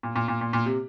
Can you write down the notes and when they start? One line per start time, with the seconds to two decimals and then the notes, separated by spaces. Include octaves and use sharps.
0.03 A#2
0.16 A#2
0.28 A#2
0.41 A#2
0.53 A#2
0.66 C3